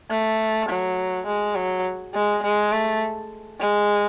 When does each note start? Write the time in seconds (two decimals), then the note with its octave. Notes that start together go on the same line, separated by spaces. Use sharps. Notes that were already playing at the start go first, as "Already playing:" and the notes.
0.10 A3
0.69 F#3
1.27 G#3
1.56 F#3
2.14 G#3
2.43 G#3
2.72 A3
3.60 G#3